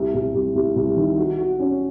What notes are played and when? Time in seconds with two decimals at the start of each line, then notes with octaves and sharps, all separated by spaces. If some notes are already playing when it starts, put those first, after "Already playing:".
Already playing: C2
0.14 C2
0.35 C2
0.56 C2
0.76 C2
0.97 D#3
1.18 F#4
1.38 F#4
1.59 C#4